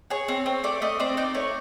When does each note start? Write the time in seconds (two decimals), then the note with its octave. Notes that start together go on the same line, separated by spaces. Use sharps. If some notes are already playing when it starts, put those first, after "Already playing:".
0.10 G#4 C#5
0.28 C4
0.46 C4
0.64 A3 D5
0.82 A3 D#5
1.00 C4 D5
1.17 D#4 D5
1.35 A3 C#5